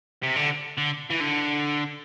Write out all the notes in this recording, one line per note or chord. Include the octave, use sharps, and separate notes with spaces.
C3
D3
D3
E3
D3